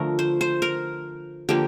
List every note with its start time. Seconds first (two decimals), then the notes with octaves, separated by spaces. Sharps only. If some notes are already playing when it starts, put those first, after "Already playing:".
Already playing: D3 F3 A3 A#4
0.19 C5
0.41 C5
0.62 A#4
1.49 D3 F3 A#3 G4